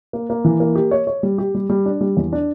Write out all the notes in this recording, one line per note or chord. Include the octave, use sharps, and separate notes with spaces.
A#3
A#3
E3
A#3
G4
C#5
C#5
G3
G4
G3
G3
D4
G3
E2
D4